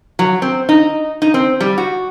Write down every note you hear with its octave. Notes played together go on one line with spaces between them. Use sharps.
F#3
C4
D#4
D#4
C4
G3
F#4